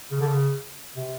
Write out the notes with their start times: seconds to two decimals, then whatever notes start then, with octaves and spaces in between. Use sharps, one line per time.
0.12 C#3
0.21 D3
0.27 C#3
0.96 C3